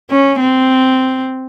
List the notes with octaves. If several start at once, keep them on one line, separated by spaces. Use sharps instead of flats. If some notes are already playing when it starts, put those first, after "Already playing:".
C#4
C4